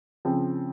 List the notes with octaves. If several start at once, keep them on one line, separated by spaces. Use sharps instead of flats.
C#3 F3 C4